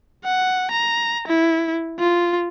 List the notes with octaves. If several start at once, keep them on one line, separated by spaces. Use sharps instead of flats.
F#5
A#5
E4
F4